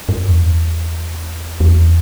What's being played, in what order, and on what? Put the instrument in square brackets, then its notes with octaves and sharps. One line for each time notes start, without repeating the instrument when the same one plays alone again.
[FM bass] G2
E2
E2